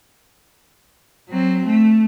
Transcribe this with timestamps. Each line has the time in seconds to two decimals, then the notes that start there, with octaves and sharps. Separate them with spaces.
1.29 F#3 C4
1.66 A3